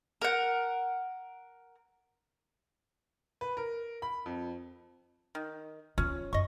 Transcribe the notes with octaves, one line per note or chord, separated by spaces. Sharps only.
A#4 F#5
B4
A#4
B5
F2
D#3
C#4 F4
F#2 D#5 C#6